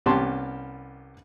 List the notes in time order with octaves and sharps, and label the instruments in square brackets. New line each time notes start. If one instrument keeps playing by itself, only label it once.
[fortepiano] C2 B3 C#4 G4 A5 C6